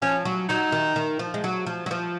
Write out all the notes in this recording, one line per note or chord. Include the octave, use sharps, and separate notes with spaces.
F3 C#4
F#3
F#3 D#4
D#3
D#3
F3
G#3
F#3
F3
F#3
F3